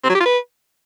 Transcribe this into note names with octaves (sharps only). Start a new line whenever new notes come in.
C4
F#3
G4
F4
B4